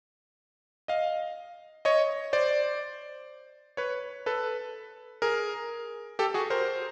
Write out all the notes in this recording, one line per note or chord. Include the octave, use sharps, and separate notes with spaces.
D#5 F5
C#5 D#5
C5 D5
B4 C#5
A4 B4
G#4 A#4
G4 A4
F#4 G#4
A#4 C5